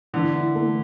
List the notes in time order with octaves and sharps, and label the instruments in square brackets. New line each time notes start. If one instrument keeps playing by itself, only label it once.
[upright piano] D3 [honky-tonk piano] E3
[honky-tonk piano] E4
A3